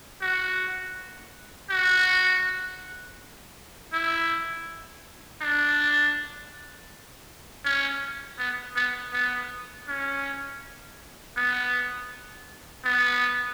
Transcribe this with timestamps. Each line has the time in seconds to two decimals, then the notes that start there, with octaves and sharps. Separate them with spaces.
0.22 F#4
1.70 F#4
3.93 E4
5.42 D4
7.65 C#4
8.39 B3
8.76 B3
9.13 B3
9.88 C#4
11.37 B3
12.85 B3